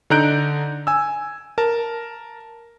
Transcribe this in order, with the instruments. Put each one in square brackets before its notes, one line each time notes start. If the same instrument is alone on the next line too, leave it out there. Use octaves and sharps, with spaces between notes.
[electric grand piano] D3 D#4 A#5 F#6 G6 D7
G#5 E6
A#4 A5